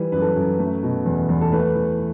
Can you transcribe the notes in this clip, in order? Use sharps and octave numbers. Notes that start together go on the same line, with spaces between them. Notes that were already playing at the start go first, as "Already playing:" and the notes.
Already playing: E3 G3
F#2 B4
A4
F#2 B4
A3
B2
E2
E2
A4
A3 B4
E3